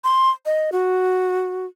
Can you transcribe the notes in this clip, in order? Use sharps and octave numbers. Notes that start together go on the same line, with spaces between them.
C6
D#5
F#4